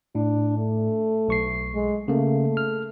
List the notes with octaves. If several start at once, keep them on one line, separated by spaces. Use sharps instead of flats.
A2 D4
A3
B1 C#6 C7
G#3
C#3 A3 A#3
F6